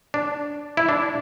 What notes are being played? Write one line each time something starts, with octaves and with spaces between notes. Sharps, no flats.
D4
E4
D4